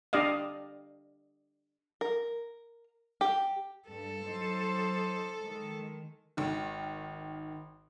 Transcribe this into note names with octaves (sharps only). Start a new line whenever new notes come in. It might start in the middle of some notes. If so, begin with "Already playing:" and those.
D4 G4 D5 D#5 F5
A#4
G4
G2 A4
F#3 D#4 C5
D#3 G#3
G#1 D#3